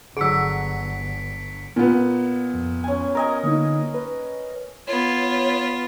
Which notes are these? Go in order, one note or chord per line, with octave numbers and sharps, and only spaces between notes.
G1 D3 F#3 G#4 E6 B6 C#7 D7
A#2 B3
F2
C#4 G#5
A#4 D#5 G#5 A#5
D3 A#3 D#4
B4
B3 F4 C#5